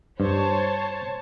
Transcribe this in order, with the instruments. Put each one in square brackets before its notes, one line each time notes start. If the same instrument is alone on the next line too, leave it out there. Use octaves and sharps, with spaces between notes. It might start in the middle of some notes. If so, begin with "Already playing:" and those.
[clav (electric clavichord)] G2 [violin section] C5 C#5 A5